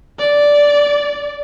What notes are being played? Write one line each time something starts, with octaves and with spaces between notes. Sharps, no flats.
D5